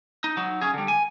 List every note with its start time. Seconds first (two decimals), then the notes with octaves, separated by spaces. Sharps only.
0.24 D#4
0.37 F#3 D#4
0.61 C#4 G#4
0.74 D3 G3
0.88 G#5